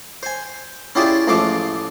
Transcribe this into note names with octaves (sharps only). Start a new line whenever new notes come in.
C5 G#5
C#4 E4 F4 G4 G#4 D5
A1 F3 G#3 A3 F5 D6